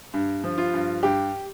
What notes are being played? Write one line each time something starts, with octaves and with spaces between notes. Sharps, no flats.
G2
F3
F4
G2
G2 G4